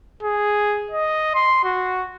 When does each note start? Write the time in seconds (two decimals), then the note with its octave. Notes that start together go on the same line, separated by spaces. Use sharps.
0.23 G#4
0.91 D#5
1.35 C6
1.64 F#4